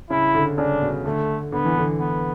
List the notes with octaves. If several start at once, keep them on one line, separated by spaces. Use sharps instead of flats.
C#3 E4
D3
C#3 D4
B2
D3 A3
D3 B3
E3
D3
B3